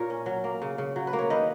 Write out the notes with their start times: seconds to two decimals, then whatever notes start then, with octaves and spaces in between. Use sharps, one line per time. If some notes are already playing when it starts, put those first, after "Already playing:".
Already playing: A#2 A#4 C#5
0.10 C#4
0.26 F#3
0.44 A#3
0.62 C#3
0.78 C#3
0.96 F#3
1.07 B4
1.13 A#3
1.19 C#5
1.30 D#3 B4 D#5